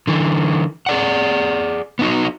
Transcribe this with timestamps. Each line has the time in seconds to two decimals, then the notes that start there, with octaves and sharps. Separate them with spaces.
0.07 D3 E3
0.86 G#4 D5 F#5
1.99 B3 D#4 F#4